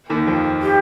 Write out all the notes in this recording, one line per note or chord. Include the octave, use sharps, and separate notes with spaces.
D#2 D#3
F2 F3
G4